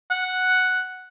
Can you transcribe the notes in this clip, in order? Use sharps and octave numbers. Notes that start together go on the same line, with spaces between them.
F#5